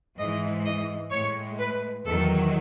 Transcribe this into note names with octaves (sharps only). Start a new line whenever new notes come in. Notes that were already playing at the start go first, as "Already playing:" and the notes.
G#2 E3 G#3 D#5
D#5
A2 G#3 C#5
B4
E2 D#3 F#3 A4